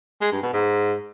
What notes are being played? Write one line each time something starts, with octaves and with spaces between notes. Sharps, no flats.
G#3
G2
B2
G#2